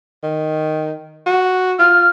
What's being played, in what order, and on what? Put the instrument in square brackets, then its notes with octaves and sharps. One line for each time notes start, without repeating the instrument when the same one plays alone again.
[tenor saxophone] D#3
F#4
[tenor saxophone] F4 [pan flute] F6